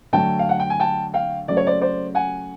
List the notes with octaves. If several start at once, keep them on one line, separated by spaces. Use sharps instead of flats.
D3 F#3 A3 G5 A5
F5
F#5
G5
G#5
G5 A5
F5 G5
C#3 F#3 A3 D5
C#5
C5 D5
C5 D5
F#5 G#5